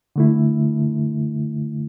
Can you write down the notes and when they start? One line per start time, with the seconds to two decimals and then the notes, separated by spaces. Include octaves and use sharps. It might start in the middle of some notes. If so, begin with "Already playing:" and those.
0.16 D3 A3 E4